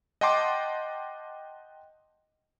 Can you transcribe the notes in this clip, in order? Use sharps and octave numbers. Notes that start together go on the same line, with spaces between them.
D#5 F#5 G5 A5 C6 D6